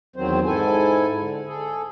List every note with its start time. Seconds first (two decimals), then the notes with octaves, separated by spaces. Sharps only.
0.16 E2 D#3 F#3 C4 C5
0.45 G#2 E4 A4 G#5
1.20 D3
1.46 G#4 A4